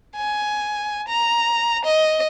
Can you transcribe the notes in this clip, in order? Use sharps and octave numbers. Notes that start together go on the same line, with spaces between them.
G#5
A#5
D#5